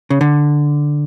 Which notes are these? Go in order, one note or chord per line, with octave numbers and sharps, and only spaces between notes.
C#3
D3